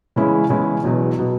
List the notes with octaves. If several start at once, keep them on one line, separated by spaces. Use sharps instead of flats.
E2 C#3 G#3 C#4 E4
E2 C#3 G#3 C#4 E4
E1 E2 B2 F#3
B2 F#3